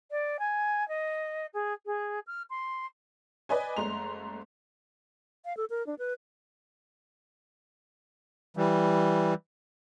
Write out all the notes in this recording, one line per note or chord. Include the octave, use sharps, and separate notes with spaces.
D5
G#5
D#5
G#4
G#4
F6
C6
B4 D5 D#5 G#5
F#1 G#3 A3 A#5 C6 F7
F5
A4
A#4
D4
B4
E3 G3